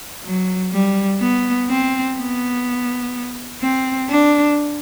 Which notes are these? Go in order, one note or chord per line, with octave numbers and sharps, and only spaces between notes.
F#3
G3
B3
C4
B3
C4
D4